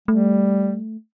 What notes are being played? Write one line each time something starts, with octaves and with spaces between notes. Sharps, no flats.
G3 A3